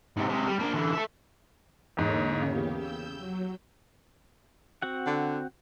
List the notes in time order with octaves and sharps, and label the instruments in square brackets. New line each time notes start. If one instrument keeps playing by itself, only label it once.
[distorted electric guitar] G#2 C3
C3 G#3
G3
A#3 D4
D3 E3
A4 E5
[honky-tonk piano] E2 G#2 [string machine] D3 A#3 C#5
[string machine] E2 G4 [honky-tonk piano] C#3
[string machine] E6 G6
F#3
[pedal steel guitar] C4 F#4 F#5
[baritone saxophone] D3